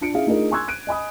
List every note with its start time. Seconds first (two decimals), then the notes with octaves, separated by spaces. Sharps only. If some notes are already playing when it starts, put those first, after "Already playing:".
0.01 D4 F4 C#7 D7
0.14 C#4 E4 G#4 E5 F5
0.26 A3 D4 D#4 F4 G#4 A#4
0.51 G#5 C6 C#6 E6 F#6 G#6
0.68 F#6 D7 D#7
0.87 D#5 G#5 B5 D#6